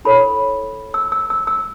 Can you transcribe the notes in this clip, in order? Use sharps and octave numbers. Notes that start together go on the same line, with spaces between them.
E4 A4 C#5 B5
E6
E6
E6
E6